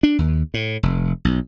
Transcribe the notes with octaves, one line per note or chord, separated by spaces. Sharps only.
D4
D#2
A2
F1
B1